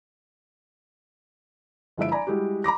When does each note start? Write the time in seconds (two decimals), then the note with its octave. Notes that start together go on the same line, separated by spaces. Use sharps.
1.98 G1 F3 G#3 E4 E5 D7
2.12 D5 G#5 A#5 B5
2.27 G3 G#3 E4 F#4 G4
2.64 A#5 B5 D6 A#6